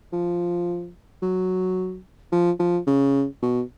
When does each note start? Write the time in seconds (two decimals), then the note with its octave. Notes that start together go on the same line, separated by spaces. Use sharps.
0.12 F3
1.22 F#3
2.32 F3
2.59 F3
2.87 C#3
3.42 B2